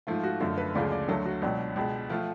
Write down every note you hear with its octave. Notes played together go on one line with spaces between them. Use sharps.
G#2 F3 A3 F4
F#4
F#2 D3 F3 A3
B4
D2 C#3 F3 G#3 D5
D5
D2 D3 F#3 A3 A4
F#4
C#2 B2 F#3 D4
C#2 B2 G#3
F3 A3 F4